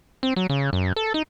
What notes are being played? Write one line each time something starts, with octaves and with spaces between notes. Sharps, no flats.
C4
F#3
C#3
F#2
A4
D#4